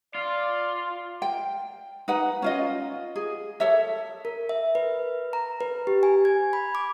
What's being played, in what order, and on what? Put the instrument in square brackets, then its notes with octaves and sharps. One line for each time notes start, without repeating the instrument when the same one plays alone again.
[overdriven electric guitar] F4 [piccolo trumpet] D5
[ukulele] G5
D#4 B4 F#5
C#4 F4 D#5
G#4
A4 C#5 E5
[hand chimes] A#4
E5
B4
A#5
B4
G4
G#5
G#6
B5
D6